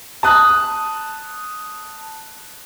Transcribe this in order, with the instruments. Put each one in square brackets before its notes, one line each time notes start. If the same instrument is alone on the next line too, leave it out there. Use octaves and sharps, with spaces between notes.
[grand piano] A5 D#6 F#6